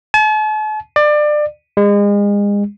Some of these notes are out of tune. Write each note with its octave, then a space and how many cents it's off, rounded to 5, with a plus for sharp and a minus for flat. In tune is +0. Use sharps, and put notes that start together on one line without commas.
A5 -45
D5 +25
G#3 -35